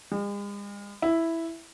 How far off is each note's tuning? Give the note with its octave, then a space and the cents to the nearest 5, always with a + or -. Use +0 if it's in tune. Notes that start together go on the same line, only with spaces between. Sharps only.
G#3 -45
E4 +0